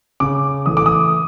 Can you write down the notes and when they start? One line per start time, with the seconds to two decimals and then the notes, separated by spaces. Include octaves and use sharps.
0.20 C#3 D6
0.66 E3 A3 D#6
0.77 D6
0.86 D#6